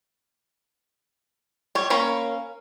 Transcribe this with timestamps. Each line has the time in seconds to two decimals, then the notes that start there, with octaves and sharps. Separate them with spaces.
1.75 G3 C#5
1.90 A#3 C#4 B5